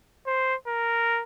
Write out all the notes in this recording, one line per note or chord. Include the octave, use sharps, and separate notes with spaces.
C5
A#4